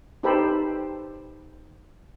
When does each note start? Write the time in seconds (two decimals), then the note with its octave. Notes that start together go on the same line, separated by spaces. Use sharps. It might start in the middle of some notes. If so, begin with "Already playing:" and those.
0.23 D#4 G4 A4 B4 C5 B5